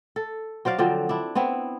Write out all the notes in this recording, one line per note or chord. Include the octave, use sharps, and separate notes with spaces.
A4
F#3 C5 D5 F5
D3 F3 F#3 C4
D4 E4
B3 C4 E4